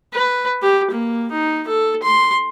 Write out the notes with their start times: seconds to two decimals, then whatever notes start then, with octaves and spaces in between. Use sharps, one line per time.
0.13 B4
0.62 G4
0.91 A#3
1.31 D#4
1.68 A4
2.03 C6